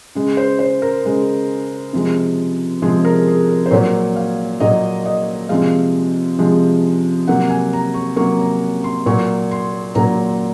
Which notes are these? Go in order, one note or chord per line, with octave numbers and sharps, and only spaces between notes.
C#3 G#3
C5
C5
A#4
C#3 G#3
C3 F3 G#3
C3 F3 G#3 G#4
A#4
G#4
A#4
C5
A#2 F#3 A#3 C#5
F5
A#2 F#3 A#3 D#5
D#5
C3 F3 G#3 F5
C3 F3 G#3
C3 F#3 A#3 F#5
G#5
A#5
C#6
C3 F#3 A#3 C#6
A#5
C6
A#2 F#3 A#3 C#6
C6
A#2 F#3 A#3 A#5